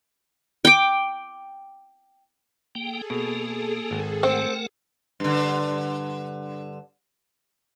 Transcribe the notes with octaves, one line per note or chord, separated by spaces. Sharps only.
G5 D6
A#3 G#4 A4 G5
B2 A#3
G#1
A3 C4 A#4 F#5
G2 D3